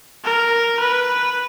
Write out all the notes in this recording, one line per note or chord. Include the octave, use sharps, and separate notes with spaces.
A#4
B4